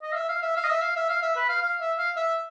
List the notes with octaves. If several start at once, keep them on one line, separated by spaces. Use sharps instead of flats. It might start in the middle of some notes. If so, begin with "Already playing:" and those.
D#5
F5
E5
F5
E5
F5
D#5
E5
F5
E5
F5
E5
B4
F5
F5
E5
F5
E5